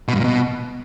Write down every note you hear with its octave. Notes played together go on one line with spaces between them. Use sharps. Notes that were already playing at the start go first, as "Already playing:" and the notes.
B2
G2
A#2
B2